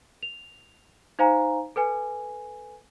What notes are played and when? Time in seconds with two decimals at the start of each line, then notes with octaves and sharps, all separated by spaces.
0.23 F7
1.19 D#4 C5 F5 G#5 A#5
1.76 A4 B4 G#5